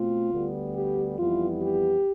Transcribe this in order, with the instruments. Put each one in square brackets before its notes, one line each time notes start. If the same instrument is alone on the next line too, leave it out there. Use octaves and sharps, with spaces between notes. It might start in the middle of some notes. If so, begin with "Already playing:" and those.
Already playing: [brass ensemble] B2 A3 C4 F4
D2 D3 G3 B3
G4
F2 E3 G3 B3 E4 F4
G4